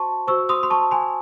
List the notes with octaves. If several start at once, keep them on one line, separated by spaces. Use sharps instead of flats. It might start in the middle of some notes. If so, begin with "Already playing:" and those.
Already playing: F#4 C5 A5 C6 C#6
F#4 C5 C#6 E6
C6 D#6
C6
A5 C#6
G#5 C6